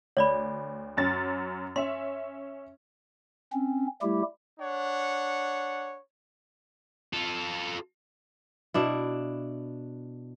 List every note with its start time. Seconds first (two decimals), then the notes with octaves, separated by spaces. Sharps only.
0.17 D2 C#5 D5 B5
0.97 F#2 C#4 A6
1.76 C#4 E5 C6
3.52 C4 C#4
4.02 G3 A3 E4 G4
4.60 D4 C#5 F#5
7.13 F4 A4
8.74 B2 D4 E4